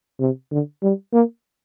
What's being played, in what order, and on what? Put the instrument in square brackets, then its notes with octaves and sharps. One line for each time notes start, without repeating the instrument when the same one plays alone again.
[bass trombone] C3
D3
G3
A#3